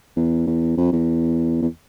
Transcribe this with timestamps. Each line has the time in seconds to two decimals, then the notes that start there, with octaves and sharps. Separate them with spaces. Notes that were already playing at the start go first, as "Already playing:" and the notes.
0.17 E2
0.47 E2
0.77 F2
0.92 E2
1.62 E2